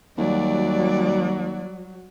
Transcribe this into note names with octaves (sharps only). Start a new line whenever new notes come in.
D#2 F#3 G3 F#4 D5